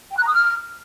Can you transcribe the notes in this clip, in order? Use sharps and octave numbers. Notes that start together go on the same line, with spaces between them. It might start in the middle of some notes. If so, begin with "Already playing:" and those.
G5
F#6
A#5
D#6
F6